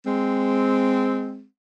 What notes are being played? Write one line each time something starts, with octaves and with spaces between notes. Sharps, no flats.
G#3 C4